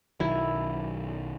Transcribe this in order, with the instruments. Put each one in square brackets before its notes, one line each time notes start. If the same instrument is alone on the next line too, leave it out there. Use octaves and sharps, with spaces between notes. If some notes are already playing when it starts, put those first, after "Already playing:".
[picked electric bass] B1 D#3 F#3 [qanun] E4